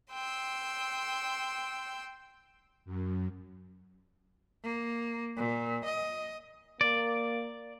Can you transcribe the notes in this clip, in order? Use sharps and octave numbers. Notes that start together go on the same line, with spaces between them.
G5 C6 E6
F#2
A#3
A#2
D#5
A#3 D5